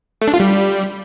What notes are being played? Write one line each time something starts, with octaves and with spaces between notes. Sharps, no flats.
A3
D4
F4
G3